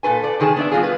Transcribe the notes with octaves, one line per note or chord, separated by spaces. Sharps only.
A#2 A4 B4 G#5
A4 D5
C3 D#3 G#4 C#5 A5
B3 D4 E5
G3 B3 F4 F#4 G#4
B4